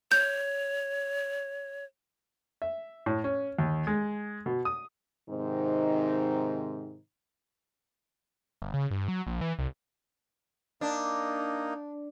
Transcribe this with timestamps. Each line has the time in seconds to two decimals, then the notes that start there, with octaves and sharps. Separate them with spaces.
0.12 C#5 G6
2.62 E5
3.06 A2
3.24 C#4
3.59 D#2
3.87 G#3
4.46 B2
4.65 D#6
5.29 G#2 C3 D#3 C4 D#4
8.62 G1
8.74 C#3
8.91 G2
9.08 F#3
9.27 A#1
9.41 E3
9.59 C2
10.81 A#3 D4 D#4